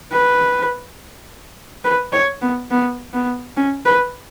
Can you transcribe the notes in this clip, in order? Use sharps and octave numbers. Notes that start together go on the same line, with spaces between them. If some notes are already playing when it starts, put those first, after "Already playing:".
B4
B4
C#5
B3
B3
B3
C#4
B4